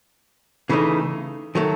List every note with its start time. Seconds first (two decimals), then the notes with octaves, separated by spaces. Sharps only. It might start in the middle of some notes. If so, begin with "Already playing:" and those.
0.69 C#3 E3 A3 D#4
1.55 D#3 F#3 A3